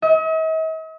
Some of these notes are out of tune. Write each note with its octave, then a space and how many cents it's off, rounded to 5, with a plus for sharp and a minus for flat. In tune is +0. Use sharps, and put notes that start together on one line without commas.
D#5 +45